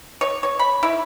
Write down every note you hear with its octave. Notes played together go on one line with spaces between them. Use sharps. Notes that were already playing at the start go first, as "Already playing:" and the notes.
C#5
C#5
B5
E4